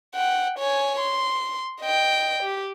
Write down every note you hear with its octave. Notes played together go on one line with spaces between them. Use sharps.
F#5 G5
C#5 G#5
C6
D#5 G5
G4